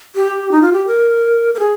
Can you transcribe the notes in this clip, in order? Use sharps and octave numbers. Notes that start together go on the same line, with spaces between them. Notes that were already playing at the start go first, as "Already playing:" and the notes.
G4
D#4
F4
G4
A#4
A#4
G#4